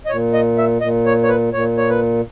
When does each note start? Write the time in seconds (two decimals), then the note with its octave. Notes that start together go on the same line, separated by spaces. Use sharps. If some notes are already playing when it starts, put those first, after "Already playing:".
0.06 D#5
0.09 A#2 C#5
0.33 D#5
0.58 E5
0.81 A#2 D#5
1.06 C#5
1.24 C#5
1.29 B4
1.53 A#2 C#5
1.77 C#5
1.89 B4